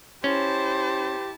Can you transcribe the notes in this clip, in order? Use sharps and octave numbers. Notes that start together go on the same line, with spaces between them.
C#4 E4 G4 C5 A5